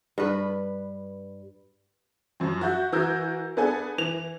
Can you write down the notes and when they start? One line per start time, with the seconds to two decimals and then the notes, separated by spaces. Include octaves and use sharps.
0.18 G2 B4
2.40 F#2 F3
2.61 F#4 E5 G6
2.92 E3 F#4 A#4 E6 G6 G#6
3.57 B3 D4 G#4 A4 G#5
3.98 E3 F7